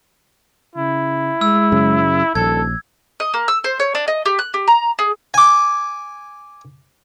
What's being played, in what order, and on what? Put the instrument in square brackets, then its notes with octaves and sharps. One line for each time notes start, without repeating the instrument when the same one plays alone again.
[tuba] C#3 [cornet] E4
[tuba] G#3 [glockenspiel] E6
[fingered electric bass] F#2 C#3
[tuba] D#1 [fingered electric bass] A#1 [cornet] A4 [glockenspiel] G#6
[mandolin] D#5
A#3
E6
C5
C#5
D4
D#5
G4
F#6
G4
A#5
G#4
[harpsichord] G#5 D6